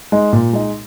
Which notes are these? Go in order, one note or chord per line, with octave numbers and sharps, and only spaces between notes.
G#3 D#4
A#2
G#3 D#4